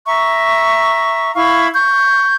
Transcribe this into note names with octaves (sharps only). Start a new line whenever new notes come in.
E5 A#5 C#6
E4 F5 B5 C#6
C#6 G6